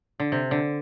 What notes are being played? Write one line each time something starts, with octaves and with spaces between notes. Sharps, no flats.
D3
C3
D3